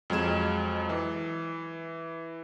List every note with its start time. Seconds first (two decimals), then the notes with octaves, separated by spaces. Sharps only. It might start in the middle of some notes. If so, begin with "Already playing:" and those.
0.10 F2 F#3 G#3 G#6 E7
0.89 E3